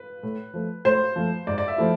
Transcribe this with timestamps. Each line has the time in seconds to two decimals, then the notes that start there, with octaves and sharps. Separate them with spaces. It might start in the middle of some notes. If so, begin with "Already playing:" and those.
Already playing: B4
0.23 A2
0.54 F3 A3
0.85 A2 C5
1.16 F3 A3
1.47 G#2 D5
1.58 D5
1.68 E5
1.78 F3 A3 E4